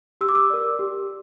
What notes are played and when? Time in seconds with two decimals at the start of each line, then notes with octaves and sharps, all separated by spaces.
0.21 G4 E6
0.29 D6
0.35 E6
0.50 A#4 D5
0.79 G4